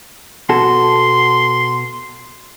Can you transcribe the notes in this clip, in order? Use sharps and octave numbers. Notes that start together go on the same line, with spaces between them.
B2 F#4 A4 C6